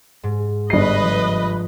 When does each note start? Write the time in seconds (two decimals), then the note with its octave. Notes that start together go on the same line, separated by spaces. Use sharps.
0.23 G#2
0.70 G1 B4 D#5 C7
1.02 F3